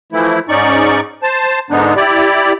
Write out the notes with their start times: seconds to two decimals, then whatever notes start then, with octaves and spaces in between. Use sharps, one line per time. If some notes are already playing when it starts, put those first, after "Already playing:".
0.12 E3 F3 A3 E4
0.49 G#2 C#4 D#4 D5 C#6
1.23 C5 A5
1.71 G#2 D3 G#3 B3 D4 D#4
1.96 E4 G4 D5